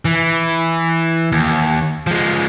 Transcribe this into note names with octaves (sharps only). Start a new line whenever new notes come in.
E3
D#2
F3 G#3